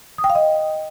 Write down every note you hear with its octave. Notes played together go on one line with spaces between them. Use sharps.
D#6
G5
F5
D#5